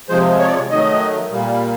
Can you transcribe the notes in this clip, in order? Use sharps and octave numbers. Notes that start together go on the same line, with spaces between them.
C3 F3 G#3 C5
C#5
D5
C#5
D#3 F#3 A3 D#5
A#2 G3 A#3